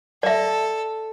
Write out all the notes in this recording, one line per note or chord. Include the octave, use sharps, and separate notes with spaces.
A4 D5 E5